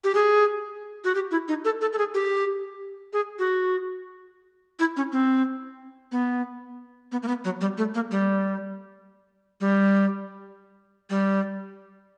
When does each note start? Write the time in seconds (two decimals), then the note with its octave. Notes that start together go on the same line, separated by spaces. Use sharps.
0.04 G4
0.15 G#4
1.04 F#4
1.15 G4
1.31 E4
1.48 D#4
1.65 A4
1.81 A4
1.93 A4
1.98 G#4
2.14 G4
3.13 G#4
3.39 F#4
4.79 E4
4.97 C#4
5.12 C4
6.12 B3
7.12 B3
7.23 A#3
7.28 B3
7.45 F#3
7.61 G3
7.78 A3
7.95 A#3
8.11 G3
9.61 G3
11.10 G3